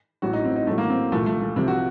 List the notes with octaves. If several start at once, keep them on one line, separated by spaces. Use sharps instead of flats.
A1 A2 F#3 F#4
D#4
C4
D#4
A1 A2 F#3 A3
A#3
C4
C2 A#2 F3 A3
A3
A3
C2 C3 F3 C4
F#4